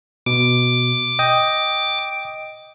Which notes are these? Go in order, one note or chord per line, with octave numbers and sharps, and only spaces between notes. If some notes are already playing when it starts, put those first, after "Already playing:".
B2 D6
D#5 G5 D#6